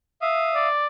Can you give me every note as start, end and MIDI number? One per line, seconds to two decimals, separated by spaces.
0.22 0.68 76
0.22 0.68 77
0.22 0.68 87
0.55 0.87 74